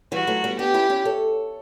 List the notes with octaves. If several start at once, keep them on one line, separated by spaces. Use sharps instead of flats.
E3 G3 F#4
F#3 A3
G3 B3
B3 D4 G4
C#4 E4
C#4 E4
A4 C#5